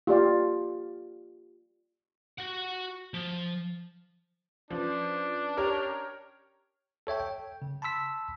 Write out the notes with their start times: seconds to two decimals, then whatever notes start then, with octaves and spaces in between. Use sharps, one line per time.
0.07 F4 G4 D5 F5
2.38 F#4 F#5
3.14 F3
4.70 F3 C#4 D4 B4
5.57 G4 A#4 C#5
7.07 A4 C#5 E5 G5
7.20 G5
7.62 C#3
7.82 A5 B5 C6 E6 B6